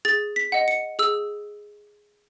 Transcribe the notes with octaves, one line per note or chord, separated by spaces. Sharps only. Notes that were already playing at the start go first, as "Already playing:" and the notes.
G#4 A6
B6
D#5 F#5
C#7
G#4 E6